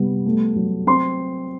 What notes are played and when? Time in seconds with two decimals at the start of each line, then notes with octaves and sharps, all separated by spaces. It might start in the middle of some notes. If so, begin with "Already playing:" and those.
Already playing: C3 G3 B3
0.26 A3
0.56 F#3
0.87 C4 C6